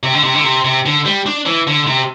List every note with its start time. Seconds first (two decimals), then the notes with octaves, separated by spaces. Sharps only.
0.03 C3
0.14 D3
0.24 C3
0.34 D3
0.44 C3
0.64 C3
0.86 D3
1.06 G3
1.26 D4
1.46 E3
1.67 D3
1.87 C3